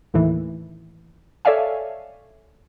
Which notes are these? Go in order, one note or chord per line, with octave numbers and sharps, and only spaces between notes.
D#2 A2 E3
A4 C#5 D5 E5 F5 G#5